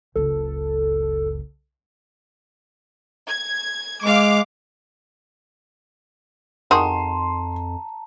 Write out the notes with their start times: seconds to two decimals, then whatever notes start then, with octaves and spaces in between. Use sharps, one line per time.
0.16 F#1 C#2 A4
3.27 G#6
4.03 G#3 F5 D6
6.71 F2 D#3 F#4 G#4 A5 A#5 C6